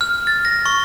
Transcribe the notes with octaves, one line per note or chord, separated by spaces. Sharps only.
F6
A6
A#6
C#6